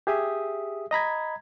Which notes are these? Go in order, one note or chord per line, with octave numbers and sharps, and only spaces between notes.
G4 G#4 E5 D#6
D#5 A#5 B5 G#6